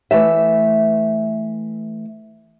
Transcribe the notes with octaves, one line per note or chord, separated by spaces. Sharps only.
E3 A3 E5